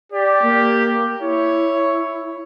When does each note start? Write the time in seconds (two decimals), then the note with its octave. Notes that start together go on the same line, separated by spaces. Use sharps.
0.12 G4 D5
0.42 A#3
1.21 E4 C#5